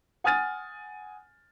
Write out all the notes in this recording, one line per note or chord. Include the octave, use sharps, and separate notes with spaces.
F#5 G#5 D#6 F6 A6 D#7